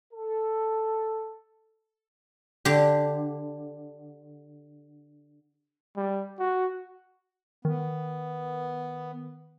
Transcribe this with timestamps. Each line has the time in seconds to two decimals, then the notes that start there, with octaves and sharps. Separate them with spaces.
0.13 A4
2.65 D3 G4
5.97 G3
6.39 F#4
7.65 D#3 B3